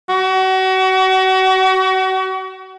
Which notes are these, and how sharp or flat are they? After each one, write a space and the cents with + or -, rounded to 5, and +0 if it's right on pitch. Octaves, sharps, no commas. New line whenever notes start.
F#4 +35